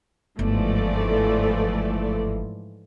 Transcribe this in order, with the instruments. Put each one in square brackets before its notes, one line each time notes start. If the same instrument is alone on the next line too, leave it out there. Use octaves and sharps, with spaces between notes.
[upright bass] G1 [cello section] G#2 E3 F3 [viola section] A3 D5